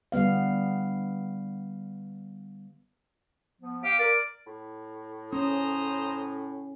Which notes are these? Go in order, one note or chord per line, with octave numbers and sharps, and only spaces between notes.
D3 G3 B3 F5
F3 B3
G4 F5
A#4 D5
A2
C#4 C5 A#5 D#6